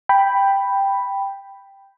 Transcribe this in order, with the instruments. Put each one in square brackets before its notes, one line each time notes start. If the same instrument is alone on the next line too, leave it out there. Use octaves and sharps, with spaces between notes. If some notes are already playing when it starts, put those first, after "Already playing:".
[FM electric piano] G5 B5